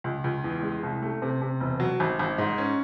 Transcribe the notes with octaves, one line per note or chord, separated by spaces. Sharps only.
C#2
C#2
E2
G#3
C2
A3
C3
C3
E1
F#3
G#1
G#1
G#2
C#4